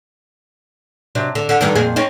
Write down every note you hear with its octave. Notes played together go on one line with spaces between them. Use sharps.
C3 F#3 D4
D3
D3
G2 D3 D#3
F2 A#2 G#4
C4 C#4 D#4